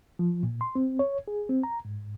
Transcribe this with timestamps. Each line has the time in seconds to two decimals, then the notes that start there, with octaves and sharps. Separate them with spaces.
0.19 F3
0.43 A#2
0.61 C6
0.75 C4
0.99 C#5
1.28 G#4
1.49 C4
1.63 A#5
1.85 G#2